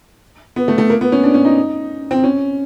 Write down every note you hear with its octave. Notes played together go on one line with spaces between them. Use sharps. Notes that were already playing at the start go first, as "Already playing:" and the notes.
B3
A3
A3
A#3
B3
C#4
D4
C#4
D#4
C4
C#4